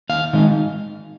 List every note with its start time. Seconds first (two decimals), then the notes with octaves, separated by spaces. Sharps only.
0.09 D#2 F5
0.33 D#3 G#3 D#4